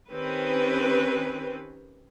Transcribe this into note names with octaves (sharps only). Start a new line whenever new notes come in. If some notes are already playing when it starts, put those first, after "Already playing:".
D#3 C4 C#4 G4 B4